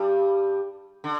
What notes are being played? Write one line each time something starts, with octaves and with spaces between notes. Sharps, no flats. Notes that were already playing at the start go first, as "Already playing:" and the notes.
Already playing: G2 G3
D3